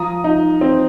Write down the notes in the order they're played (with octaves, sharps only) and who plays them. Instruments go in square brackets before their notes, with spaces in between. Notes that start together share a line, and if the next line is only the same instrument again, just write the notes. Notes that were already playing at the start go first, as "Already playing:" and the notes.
Already playing: [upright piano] F3 A#5 D#6
D#4
C4